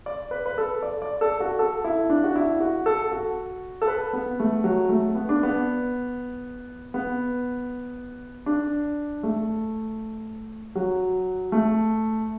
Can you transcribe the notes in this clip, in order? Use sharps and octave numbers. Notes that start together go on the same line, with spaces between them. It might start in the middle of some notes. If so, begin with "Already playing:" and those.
D5
B4
B4
A4
D5
D5
A4
F#4
A4
E4
D4
F#4
E4
F#4
A4
F#4
A4
B4
B3
A3
F#3
A3
B3
D4
B3
B3
D4
A3
F#3
A3